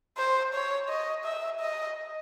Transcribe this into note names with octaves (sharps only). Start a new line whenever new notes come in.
C5
C#5
D#5
E5
D#5